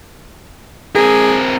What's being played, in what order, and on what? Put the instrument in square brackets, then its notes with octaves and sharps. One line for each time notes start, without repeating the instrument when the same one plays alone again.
[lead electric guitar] C4 A#4 [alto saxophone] G#4